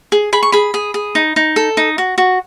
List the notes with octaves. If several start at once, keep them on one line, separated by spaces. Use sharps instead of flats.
G#4
G#4 B5
C#6
G#4 B5
G#4
G#4
D#4
D#4
A4
D#4
F#4
F#4